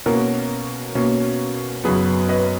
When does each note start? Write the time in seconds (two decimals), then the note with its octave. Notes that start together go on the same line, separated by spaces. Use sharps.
0.06 B2 A#3 C#4 F#4 A#4
0.95 B2 A#3 C#4
1.84 F#2 C#3 F#3 B3 G#4 B4
2.29 B4 D#5